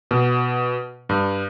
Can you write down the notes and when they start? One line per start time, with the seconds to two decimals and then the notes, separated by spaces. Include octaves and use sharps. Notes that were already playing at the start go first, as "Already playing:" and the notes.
0.11 B2
1.09 G2